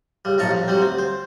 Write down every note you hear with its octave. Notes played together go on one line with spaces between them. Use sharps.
C#2 G3
B1 A2 F3 A5 A#5 C#6
F2
F#3 G3 C4
D2 C4
C5